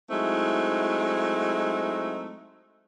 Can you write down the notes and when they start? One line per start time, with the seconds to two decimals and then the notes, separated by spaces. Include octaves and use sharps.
0.10 F#3 G#3 A3 C4 D#4 E4